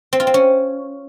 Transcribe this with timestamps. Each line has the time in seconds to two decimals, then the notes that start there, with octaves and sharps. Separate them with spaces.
0.13 C4
0.20 F4
0.27 C4
0.34 C#4